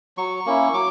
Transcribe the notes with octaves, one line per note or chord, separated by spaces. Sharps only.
F#3 C#6
A#3 C#4 E4
F#3 D6